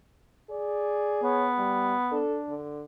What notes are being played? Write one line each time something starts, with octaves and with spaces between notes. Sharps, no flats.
G#4 D5
B3 C#5
G3
D4 A4
D3